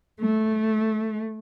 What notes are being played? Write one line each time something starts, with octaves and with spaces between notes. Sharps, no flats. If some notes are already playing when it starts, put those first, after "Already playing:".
A3